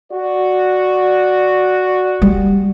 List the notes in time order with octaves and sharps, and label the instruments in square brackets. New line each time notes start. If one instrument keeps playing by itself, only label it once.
[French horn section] F#4 D5
[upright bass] G3